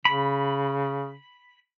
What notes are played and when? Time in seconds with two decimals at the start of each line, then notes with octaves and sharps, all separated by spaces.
0.05 C#3 B5